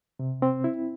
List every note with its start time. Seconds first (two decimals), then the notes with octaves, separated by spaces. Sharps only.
0.19 C3
0.42 C4
0.64 E4